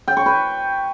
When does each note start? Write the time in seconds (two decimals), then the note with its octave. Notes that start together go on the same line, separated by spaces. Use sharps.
0.08 G5
0.17 C#6
0.26 B4